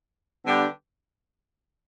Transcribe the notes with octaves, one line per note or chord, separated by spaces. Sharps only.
D3 G3 B3 D4 G4